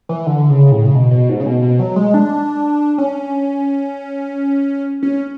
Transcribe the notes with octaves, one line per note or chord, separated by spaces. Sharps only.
E3
D3
C#3
A2
C#3
B2
B2
G#2
C#3
B2
B2
F#3
G#3
D4
C#4
C#4